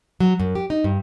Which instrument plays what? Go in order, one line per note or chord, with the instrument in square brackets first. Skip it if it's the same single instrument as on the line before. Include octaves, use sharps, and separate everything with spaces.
[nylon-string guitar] F#3
F#2
G4
D#4
G2